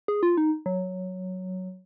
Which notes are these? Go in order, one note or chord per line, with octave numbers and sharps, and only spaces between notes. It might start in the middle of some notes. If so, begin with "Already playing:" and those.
G#4
F4
D#4
F#3